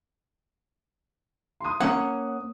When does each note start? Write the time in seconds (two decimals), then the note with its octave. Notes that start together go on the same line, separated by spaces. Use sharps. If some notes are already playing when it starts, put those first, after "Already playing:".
1.60 C6 D#6
1.80 A#3 C#4 C#5 F#5 D#6